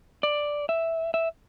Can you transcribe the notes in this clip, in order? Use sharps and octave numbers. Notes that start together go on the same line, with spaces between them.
D5
E5
E5